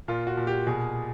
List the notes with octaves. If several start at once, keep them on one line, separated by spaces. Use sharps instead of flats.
A#2 F4
F#4
A#2
G4
B2 G#4